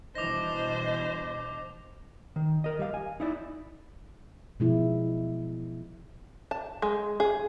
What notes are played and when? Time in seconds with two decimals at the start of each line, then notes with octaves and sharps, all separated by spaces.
0.15 B2 E3 G3 D4 C5 D#5 D6 A#6
2.36 D#3
2.64 A#4 D#5
2.79 G3 F5
2.94 G#5
3.20 D#4 E4 D5
4.60 B2 F3 G#3 B3 E4
6.51 A5
6.82 G#3
7.20 G#4